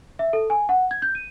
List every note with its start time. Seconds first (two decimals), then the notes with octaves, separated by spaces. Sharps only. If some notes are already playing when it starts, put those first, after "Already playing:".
0.19 E5
0.33 A4
0.50 G#5
0.69 F#5
0.91 G#6
1.02 G6
1.15 D#7